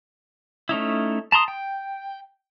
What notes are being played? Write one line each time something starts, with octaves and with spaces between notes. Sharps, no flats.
A3 C#4 D#4 E4
A5 A#5 C6 D#6
G5